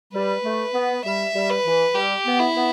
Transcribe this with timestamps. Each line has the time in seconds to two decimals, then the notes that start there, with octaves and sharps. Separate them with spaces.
0.14 G3 B4
0.44 A3
0.74 B3
1.04 G3 E5
1.34 G3
1.50 B4
1.65 E3
1.95 G3 G4
2.25 B3
2.39 E4
2.55 B3